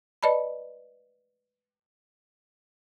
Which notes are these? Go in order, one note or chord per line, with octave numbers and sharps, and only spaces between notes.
B4 D5 D#5 A5 B5